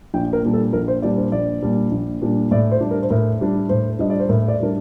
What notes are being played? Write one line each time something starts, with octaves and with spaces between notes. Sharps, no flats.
A#1 G5
A#4
A#2 G3 D4
A4
A#1 A#4
C5
A#2 G3 D4 D5
C5
A#1 D5
A#2 G3 D4
A#1
A#2 G3 D4
A2 D5
C5
G3 D4
A#4
C5
A2 A#4
G3 D4
A2 C5
G3 D4 D#5
D5
C5
A2 A#4
D5
G3 D4 A#4